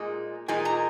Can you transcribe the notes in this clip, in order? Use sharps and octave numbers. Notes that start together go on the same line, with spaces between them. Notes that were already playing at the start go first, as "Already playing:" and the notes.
Already playing: A#2 G#3 D#4
A#2 G#3 D#4 G#5
A#5